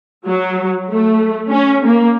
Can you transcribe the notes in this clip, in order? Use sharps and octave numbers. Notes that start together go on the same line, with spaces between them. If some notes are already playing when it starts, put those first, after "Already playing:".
F#3
A3
C#4
A#3